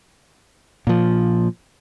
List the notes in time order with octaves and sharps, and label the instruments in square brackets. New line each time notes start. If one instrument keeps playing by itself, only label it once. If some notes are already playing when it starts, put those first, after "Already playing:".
[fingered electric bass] A#2 F3